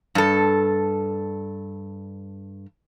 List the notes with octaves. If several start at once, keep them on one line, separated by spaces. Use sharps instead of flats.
G2 A4